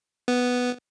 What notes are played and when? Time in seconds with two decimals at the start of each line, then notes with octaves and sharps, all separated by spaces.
0.28 B3